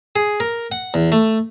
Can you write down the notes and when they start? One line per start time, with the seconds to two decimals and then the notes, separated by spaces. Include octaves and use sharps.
0.16 G#4
0.40 A#4
0.72 F#5
0.94 E2
1.12 A3